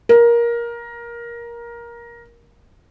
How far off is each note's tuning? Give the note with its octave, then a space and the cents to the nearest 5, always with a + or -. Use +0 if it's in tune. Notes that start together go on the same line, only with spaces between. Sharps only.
A#4 +15